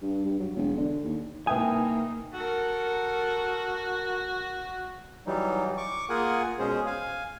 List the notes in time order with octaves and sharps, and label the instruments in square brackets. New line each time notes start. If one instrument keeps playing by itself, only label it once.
[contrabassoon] G2
G2
F#3
E1
D3
D#2
[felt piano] C2 B4 E5 [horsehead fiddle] A#3 D#4 [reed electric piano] G5 D#6 [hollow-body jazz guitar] G#5
[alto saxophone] F#4 [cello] A4 A#4
[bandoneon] E3 F#3 G3 D#4
C#6 D6
A#3 F4 G#4 A#4 F#5 G#5
B2 G#3 C#4 G#4 C5
F5 G#5